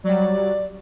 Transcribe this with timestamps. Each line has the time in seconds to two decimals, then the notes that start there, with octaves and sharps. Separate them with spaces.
0.04 F#3 G3 D5